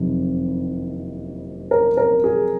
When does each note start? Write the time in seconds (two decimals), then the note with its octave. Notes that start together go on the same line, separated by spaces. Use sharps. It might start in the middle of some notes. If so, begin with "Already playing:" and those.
Already playing: F#1 F2 C3 D#3
1.71 A#4
1.97 A#4
2.24 G#4